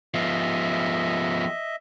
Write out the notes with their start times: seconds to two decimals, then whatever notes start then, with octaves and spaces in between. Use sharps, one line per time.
0.14 F3 B3 D#5 E5